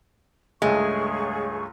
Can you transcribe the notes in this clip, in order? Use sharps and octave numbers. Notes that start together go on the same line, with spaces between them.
C#2 G2 G#3 A3 G#4 C#5 C#6